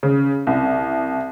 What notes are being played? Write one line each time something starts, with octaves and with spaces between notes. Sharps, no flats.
C#3
C2